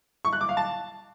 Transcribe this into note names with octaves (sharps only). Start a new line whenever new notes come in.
C#6
F#6
D6
F5
A5